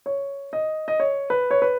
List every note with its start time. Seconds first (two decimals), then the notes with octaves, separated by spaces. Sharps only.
0.06 C#5
0.53 D#5
0.88 D#5
1.00 C#5
1.30 B4
1.51 C#5
1.62 B4